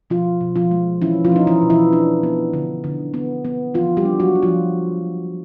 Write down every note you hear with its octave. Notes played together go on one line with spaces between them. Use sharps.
B2 F3 F4
B2
F3 F4
G#3
E3 C#4 E4
F3 F4
C#4 D#4
E3 E4
B2
E3 E4
D4
B3
D3
D3
B3
B3
E3 F3 F4
G3 G4
D4
F#3 F#4
D4
F3 F4